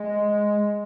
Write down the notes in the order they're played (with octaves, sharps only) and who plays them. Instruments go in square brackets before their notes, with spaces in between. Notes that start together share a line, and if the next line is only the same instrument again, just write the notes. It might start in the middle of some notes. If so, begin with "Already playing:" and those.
Already playing: [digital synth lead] G#3